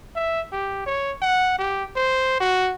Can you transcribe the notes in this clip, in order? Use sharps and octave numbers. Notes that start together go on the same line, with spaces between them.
E5
G4
C#5
F#5
G4
C5
F#4